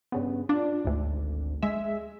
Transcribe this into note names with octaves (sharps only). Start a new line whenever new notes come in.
G2 C#3 B3
D4 F4
G#1 D2
G#3 E5